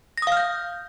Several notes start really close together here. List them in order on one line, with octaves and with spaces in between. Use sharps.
A#6 D#6 F5 F6 G6